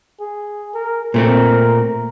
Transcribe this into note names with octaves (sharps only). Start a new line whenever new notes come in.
G#4
A#4
A#2 A3 C4 A#4